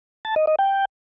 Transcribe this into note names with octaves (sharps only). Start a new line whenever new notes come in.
A5
D#5
D#5
G5